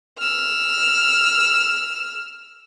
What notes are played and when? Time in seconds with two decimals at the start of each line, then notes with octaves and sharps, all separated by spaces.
0.18 E6 F6